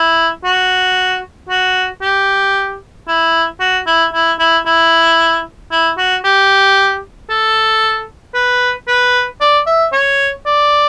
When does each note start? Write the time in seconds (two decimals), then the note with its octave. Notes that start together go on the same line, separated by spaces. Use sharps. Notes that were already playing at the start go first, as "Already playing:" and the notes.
Already playing: E4
0.44 F#4
1.49 F#4
2.02 G4
3.08 E4
3.60 F#4
3.87 E4
4.14 E4
4.39 E4
4.66 E4
5.71 E4
5.98 F#4
6.24 G4
7.30 A4
8.34 B4
8.88 B4
9.41 D5
9.67 E5
9.93 C#5
10.46 D5